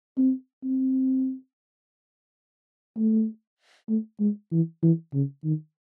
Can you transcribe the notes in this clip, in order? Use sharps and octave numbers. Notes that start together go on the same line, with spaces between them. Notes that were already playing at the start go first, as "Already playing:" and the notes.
C4
C4
A3
A3
G#3
E3
E3
C#3
D#3